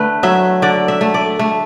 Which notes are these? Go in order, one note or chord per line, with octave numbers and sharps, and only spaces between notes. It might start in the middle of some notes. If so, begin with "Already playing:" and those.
Already playing: D3 A3 B4
F#3 E5
D3 D5
E5
A3
D5
A3